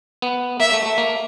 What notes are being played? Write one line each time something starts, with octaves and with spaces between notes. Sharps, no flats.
B3
A#3 E5
A3
A3
A#3